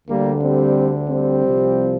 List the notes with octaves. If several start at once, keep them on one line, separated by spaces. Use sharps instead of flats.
D2 D3 G3 A#3
G3 C4
G3 C4
C2 C3 F3